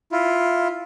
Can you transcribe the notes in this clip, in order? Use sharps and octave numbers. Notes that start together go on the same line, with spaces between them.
E4 F4